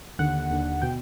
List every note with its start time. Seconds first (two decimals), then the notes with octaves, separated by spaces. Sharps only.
0.19 D#2 D3 F#5
0.50 D#2 D3
0.82 B2 G5